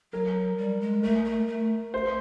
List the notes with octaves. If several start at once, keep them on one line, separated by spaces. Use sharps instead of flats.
F#3 A#4
G3
G#3
A3 A#4
A3
A3
C5